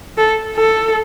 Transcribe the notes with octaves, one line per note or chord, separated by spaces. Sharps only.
A4
A4